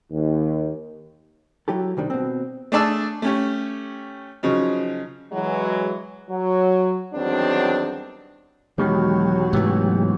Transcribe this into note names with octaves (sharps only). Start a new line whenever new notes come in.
D#2
F#3 E4 G4 A4
C2 D#3 G3 D4
B2 C4
A3 D4 G#4 D5 A5 E6
A3 C#4 G4
C#3 F3 F#3 D#4
E3 F#3 G#3
F#3
E2 D#3 F#3 G3 C4 D4
E2 B2 D#3 F#3 G#3 G4
G#2 C3 E3 A3 B3 C#4